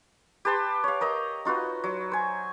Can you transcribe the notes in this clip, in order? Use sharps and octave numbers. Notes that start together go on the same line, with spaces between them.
G4 B4 A5 C6
C#5 F5
A#4 D#5 A#5
D#4 F4 F#4 B4
F#3
C5 G#5